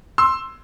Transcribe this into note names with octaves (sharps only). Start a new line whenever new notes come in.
C6 E6